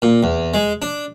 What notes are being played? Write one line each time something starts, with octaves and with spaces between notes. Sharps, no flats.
A#2
E2
G#3
D4